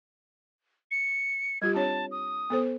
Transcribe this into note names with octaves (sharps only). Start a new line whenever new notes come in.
C#7
G3 F4 G4 G#6
C4 D4 C#5 A5
D#6
B3 A4 C5